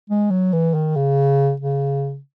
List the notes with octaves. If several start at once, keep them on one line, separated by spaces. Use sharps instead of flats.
G#3
F#3
E3
D#3
C#3
C#3